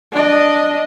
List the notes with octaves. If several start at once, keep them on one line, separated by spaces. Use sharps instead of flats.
D4 D#5